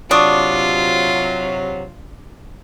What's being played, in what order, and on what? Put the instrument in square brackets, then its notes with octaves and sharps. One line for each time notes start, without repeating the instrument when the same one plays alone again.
[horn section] C3 F#3 [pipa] D4 [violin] F4 [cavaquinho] D5 C#6 D#6